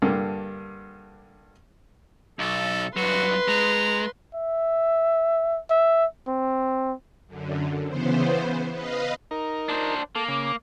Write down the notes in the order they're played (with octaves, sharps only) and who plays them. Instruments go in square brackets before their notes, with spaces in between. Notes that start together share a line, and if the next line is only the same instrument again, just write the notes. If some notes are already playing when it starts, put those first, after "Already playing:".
[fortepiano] G2 D3 A#3
[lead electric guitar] B1 [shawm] A4
[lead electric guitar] G2 F#3 [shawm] F#4 [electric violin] B4 C6
[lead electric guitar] G#3 [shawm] A#5
[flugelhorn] E5
E5
C4
[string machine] F#2 D3
C#3 E3 B3 C5
B4 D#5 F5
[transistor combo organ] D#4 A#4
[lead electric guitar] D4 C5
[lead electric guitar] A#3 [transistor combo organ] A4
[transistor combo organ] C#3 D6